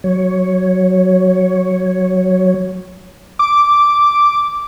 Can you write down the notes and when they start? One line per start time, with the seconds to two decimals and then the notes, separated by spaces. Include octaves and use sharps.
0.04 F#3 C#5
3.39 D6